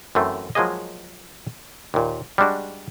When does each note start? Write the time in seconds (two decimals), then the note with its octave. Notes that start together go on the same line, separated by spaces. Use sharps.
0.15 F#2 E3 A3 C4
0.55 F3 F#3 G#3 A#3 G#4 D#5
1.94 D#2 A#2
2.38 G3 G#3 D4 F#4